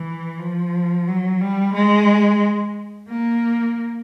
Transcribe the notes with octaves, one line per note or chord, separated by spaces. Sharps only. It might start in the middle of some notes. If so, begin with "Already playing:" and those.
Already playing: E3
F3
F#3
G3
G#3
A#3